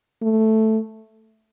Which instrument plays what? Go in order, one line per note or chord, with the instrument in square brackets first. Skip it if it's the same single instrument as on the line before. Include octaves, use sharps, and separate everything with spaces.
[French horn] A3